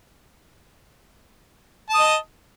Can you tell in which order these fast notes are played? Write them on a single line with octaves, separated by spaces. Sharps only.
A5 D#6 D#5